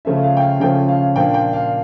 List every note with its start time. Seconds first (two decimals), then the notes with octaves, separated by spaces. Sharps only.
0.05 C#3 F3 A3 C#4 E5
0.24 F5
0.37 G5
0.42 F5
0.60 C#3 F3 A3 C#4 G5
0.89 F5
1.16 A#2 F3 A#3 D4 G5
1.34 G5
1.53 F5